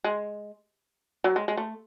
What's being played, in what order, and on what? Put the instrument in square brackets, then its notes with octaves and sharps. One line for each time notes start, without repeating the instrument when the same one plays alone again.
[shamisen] G#3
F#3
G#3
G#3
A3